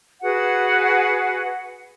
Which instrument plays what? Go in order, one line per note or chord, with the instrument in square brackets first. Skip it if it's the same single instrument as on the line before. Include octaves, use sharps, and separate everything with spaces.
[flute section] F#4 G#4 B4 F#5